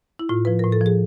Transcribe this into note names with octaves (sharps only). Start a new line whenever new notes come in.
E4
A2 F4
F3 B4
A2 A#4
A4
F3 G#4